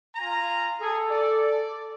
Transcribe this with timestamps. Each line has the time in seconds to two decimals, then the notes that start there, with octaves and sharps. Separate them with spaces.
0.16 F4 G#5 A#5
0.81 G#4 A4
1.11 D5